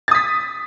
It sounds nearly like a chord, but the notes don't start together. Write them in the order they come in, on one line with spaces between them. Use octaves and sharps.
A6 D#6 B6